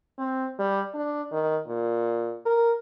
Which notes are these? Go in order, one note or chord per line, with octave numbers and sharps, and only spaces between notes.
C4
G3
D4
D#3
A#2
A#4